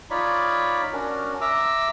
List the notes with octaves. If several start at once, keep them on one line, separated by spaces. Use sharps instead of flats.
D#4 F4 C#5 D5 B5
C#4 D4 F#4 A#4
E5 A#5 D6 E6